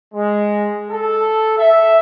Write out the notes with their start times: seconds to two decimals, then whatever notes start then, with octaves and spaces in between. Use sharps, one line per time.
0.14 G#3
0.90 A4
1.58 E5